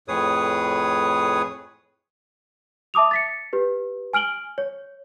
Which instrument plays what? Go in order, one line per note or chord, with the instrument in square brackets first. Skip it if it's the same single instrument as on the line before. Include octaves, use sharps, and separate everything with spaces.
[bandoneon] F2 A2 G#4 B4 C#5 D#6
[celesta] E5 A5 D6 D#6 F7
A6 B6 C#7
G4 B4
G#5 F6 D7 F#7 G7
C#5